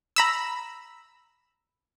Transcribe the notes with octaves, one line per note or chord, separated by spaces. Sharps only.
A#5 B5 E6